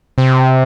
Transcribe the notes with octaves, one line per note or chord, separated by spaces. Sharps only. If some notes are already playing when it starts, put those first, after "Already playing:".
C3